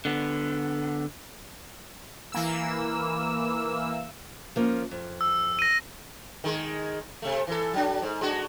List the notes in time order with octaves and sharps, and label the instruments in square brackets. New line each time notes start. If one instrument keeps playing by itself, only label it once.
[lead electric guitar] D3 B3
[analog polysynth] E3 A#3 E6
[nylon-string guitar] F3 A#3 C#4
F2
[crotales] E6
A#6 D#7
[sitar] D#3 G#3
C3 A3
E3 A4
F#3 D4
G#2
G#3 D4 F#4